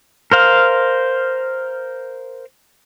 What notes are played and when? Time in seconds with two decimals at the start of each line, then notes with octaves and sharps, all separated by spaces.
0.32 A#4 C5 F5